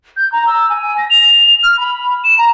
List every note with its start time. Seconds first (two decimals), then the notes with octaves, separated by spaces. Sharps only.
0.16 G6
0.32 A#5
0.47 E6
0.70 G#5
0.98 A#6
1.10 F7
1.63 F6
1.78 B5
2.24 E7
2.38 A#5